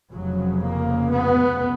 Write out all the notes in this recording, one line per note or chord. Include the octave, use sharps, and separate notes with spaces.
F1 F2 C#3 F#3
A#3
B3